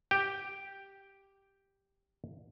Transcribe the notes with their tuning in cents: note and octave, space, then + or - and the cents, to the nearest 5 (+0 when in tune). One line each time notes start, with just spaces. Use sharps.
G4 +0 G5 +0